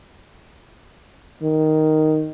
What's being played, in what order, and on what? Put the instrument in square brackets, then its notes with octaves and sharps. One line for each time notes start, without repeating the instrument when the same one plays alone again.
[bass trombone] D#3